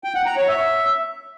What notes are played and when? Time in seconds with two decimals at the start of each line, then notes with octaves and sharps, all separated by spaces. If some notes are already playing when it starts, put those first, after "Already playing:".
0.04 G5
0.15 F#5
0.26 A#5
0.37 C#5
0.48 E5